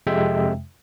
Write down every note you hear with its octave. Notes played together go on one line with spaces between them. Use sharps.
F2 C3 G#3 E5 G5